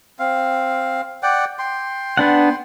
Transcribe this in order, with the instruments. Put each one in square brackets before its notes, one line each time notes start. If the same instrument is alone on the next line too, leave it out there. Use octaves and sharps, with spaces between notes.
[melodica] C4 F5
D5 F#5 G5
G5 C6
[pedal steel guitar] B3 D4 F#5